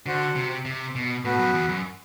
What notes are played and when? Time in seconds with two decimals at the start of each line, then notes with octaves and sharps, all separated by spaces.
0.06 D3 F#4 C5 F#5
0.36 C3
0.65 C3
0.95 B2
1.24 A2 B3 F#4 B4
1.39 F#2
1.54 E2
1.69 F#2